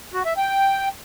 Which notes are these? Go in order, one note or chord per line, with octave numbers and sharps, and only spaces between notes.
F#4
E5
G5